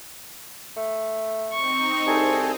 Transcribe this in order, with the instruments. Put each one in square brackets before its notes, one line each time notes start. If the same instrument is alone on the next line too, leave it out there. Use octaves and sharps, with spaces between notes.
[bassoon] A3
[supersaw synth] C4 D#4 [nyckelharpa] C#6
[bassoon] C2 [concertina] G#4 A4